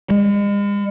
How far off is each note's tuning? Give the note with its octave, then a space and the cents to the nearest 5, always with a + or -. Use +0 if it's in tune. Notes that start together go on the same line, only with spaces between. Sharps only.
G#3 -40